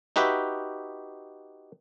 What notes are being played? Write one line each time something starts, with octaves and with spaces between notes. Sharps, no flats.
D#4 F#4 G4 B4 E5